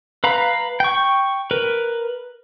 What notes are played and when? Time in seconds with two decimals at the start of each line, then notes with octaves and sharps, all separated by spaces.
0.24 B4 F5 A#5 B5
0.80 G5 C#6
1.51 A#4 B4